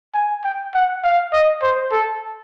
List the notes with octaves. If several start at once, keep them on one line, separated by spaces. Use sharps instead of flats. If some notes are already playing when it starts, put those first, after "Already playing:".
G#5
G5
F#5
F5
D#5
C5
A4